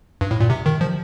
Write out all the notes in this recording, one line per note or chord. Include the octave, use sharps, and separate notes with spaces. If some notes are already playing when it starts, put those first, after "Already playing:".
G2
A2
A#2
C3
D#3
F3